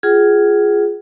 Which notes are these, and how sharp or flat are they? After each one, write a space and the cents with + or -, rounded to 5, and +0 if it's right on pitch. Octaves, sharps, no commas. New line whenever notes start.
F4 +0 G#4 +0 F#5 +40